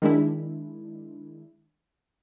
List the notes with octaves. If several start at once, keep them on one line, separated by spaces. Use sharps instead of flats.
D#3 G#3 D4 E4